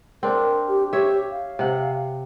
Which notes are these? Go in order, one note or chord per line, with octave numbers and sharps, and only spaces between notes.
C4 D4 A#4
G4
G4 C#5 E5
F5
C3 F#5